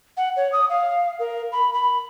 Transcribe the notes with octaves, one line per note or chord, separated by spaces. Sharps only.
F#5
C#5
D#6
F5
A#4
B5
B5